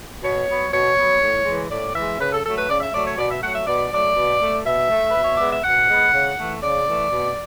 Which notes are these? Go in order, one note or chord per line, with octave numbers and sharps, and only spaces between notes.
B2 C#5
F#3 B3
B2 C#5
F#3 B3
A2
E3 G#3
A2 D5
E3 G#3 E5
C#3 B4
A4
F#3 A3 A4
B4
C#3 D5
E5
F#3 A3 D5
C#5
B2 D5
E5
F#3 A3 F#5
E5
B2 D5
F#3 A3 D5
B2
A3
B2 E5
A3
B2 B4
C#5
G#3 B3 D5
E5
B2 F#5
G#3 B3
C#3
E3 A3
C#3 D5
E3 A3
B2